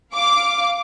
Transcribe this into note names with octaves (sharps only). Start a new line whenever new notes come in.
F5 D6